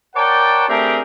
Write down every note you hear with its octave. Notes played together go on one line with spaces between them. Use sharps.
A#4 C#5 D5 F#5 G5 A5
A3 C4 D4 G4 G#4 A#4